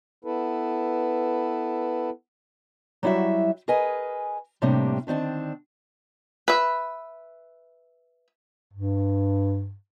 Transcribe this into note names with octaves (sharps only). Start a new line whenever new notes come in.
B3 E4 A4 B4
F#3 G3 E4 F#4 E5
G#4 A#4 B4 D#5 G#5
A2 C3 G3 A#3 D4
D3 D#3 C4 D4
B4 E5
G2